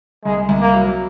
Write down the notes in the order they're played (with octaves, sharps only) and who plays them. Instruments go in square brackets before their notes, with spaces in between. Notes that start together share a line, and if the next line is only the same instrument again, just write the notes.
[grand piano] C2 [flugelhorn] G#3
[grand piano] C2
[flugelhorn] A#3
[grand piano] F#3